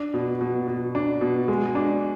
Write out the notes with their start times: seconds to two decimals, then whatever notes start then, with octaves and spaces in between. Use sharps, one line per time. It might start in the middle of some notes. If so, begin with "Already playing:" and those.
Already playing: D4
0.14 B2
0.41 B2
0.68 B2
0.95 D4
1.21 B2
1.48 G#3
1.75 D4